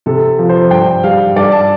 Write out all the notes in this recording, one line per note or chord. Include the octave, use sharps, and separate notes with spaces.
C3 A4
F3
C5
G2 G5
G3 F5
G2 D5
A5